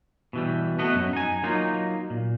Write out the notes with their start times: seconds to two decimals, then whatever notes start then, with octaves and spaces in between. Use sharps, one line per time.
0.33 B2 E3 G3
0.79 A3 B3 F#4 D#5
0.95 F#2
1.13 D#4 G#5
1.43 F#3 A#3 D#4 F4
2.10 A#2